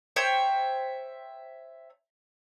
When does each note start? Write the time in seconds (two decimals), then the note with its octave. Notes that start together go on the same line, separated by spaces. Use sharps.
0.16 C5 C#5 E5 G5